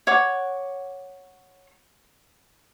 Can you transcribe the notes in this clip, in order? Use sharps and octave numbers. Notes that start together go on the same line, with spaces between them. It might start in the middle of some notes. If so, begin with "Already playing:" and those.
C#5 F#5 D6